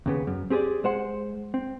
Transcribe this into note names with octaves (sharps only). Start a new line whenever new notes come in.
D#2 C#3 B3
F#2
C4 G4 G#4 C#5 D5
G#3 C5 F#5
C4